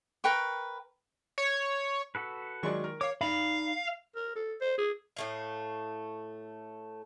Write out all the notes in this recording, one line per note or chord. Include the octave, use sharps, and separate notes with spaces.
A#4 B4 G5 C#6
C#5
F#4 A4 B4
D#3 F#3 G#3 D5 C#6
A#4
C#5 F5 D6
D#4 D5 F5 B5
A#4
A4
C5
G#4
A2 A3 F5